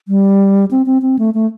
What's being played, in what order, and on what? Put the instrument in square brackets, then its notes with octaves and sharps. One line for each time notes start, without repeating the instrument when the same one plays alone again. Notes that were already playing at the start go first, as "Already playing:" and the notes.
[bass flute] G3
C4
C4
C4
A3
A3